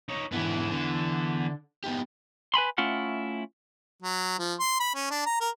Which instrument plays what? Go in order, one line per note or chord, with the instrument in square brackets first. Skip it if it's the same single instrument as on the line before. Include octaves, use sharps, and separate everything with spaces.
[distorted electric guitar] D#4 C#5
[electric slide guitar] G#2 D3 E4 [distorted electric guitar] E3 B3
[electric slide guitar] D3
B3 D#4 G4
[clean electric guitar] B4 G#5 B5 C6
A3 C#4 E4 F4 F#5
[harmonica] F#3
F3
C6
B5
C#4
D4
A#5
A#4